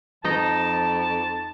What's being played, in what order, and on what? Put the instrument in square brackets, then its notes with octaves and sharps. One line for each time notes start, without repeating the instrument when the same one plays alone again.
[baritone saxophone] F2 [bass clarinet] F3 [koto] D#4 D#5 [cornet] A5